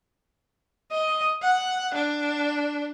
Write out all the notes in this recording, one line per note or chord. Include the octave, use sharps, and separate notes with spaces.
D#5
F#5
D4